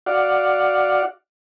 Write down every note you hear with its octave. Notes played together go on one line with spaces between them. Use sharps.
F#4 D5 F5 F#5